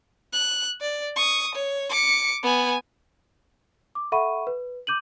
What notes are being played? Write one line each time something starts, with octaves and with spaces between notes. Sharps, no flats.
F#6
D5
C#6 D#6
C#5
D6 C#7
B3 G#5
D6
A4 E5 F#5 B5 C#6 D#7
B4
D6 G6 D#7 F#7